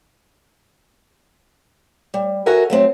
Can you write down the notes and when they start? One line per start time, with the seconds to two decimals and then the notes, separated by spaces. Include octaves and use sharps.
2.14 G3
2.46 F#4 A4 A#4 E5 F#5 G#5
2.70 F#3 A3 C4